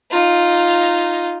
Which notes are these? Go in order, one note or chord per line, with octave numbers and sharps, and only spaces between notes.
D#4 F4